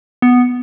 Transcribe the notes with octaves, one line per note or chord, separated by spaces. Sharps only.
B3